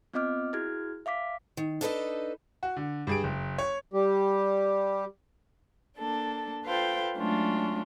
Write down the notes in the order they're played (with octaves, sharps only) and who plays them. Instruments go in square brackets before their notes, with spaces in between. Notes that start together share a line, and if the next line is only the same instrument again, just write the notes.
[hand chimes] B3 C4 F4 D#5 D6 F6
E4 F#4 G#4 F6 G#6
E5 F5 D6 B6
[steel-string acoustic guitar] D#3
D4 D#4 A4 B4 C#5 D#5
[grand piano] F#4
D3
G2 G#4 D7
F#1
C#5
[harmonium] G3 G4
[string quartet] A#3 D4 A4
F4 A4 B4 C5 F5 G5
F#3 G#3 A3 C#4 D4 F4